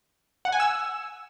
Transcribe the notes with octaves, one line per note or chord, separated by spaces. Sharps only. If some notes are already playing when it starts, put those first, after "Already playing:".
F#5
G#5
E6